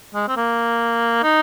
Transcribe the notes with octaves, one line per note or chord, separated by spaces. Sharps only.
G#3
C4
A#3
D#4